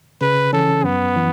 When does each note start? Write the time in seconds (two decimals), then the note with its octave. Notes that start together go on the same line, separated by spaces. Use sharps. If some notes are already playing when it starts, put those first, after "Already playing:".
0.21 C#3 B4
0.53 E3 C#4 A4
0.84 F#2 B3
1.16 E3